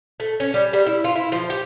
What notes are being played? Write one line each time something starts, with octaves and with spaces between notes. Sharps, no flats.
A3
C#4
G3
G3
E4
F4
E4
F3
G4